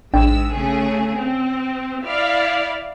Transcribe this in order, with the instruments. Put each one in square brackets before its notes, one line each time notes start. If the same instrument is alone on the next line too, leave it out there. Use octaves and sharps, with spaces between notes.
[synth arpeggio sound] A1 D4 G5 [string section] G#2 G#3 E6
[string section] C#3 A3 G#4
C4
E4 D5 F5